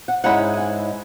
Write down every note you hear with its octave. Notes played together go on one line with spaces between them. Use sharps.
F#5
G#2 G#3 C#4 E4 F#5
G#5